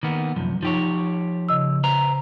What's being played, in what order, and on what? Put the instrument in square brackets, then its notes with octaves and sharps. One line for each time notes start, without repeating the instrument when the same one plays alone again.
[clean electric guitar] D#3 A#3 B3
C2 F#2 F3
[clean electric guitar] F3 G4 C#5 [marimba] D#4
[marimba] C#3 D#5 E6
[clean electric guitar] B4 C5 A#5